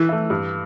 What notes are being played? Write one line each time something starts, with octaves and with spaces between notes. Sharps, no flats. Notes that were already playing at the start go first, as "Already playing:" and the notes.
Already playing: E3
A3 E4
G2